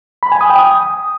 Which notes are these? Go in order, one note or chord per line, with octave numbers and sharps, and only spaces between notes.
B5
G#5
D#6
G5
D#6